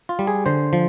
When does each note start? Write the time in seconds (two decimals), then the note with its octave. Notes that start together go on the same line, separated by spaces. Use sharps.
0.09 F4
0.19 G3
0.27 G#4
0.46 D3 C5
0.73 F3